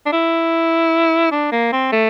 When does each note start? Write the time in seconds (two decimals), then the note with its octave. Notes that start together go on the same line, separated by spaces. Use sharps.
0.06 D4
0.12 E4
1.32 D4
1.52 A#3
1.72 C4
1.92 A3